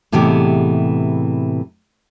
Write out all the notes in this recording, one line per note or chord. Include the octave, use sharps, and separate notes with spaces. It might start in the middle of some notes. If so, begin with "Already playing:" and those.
A2 C3 E3 G#3 B3 G4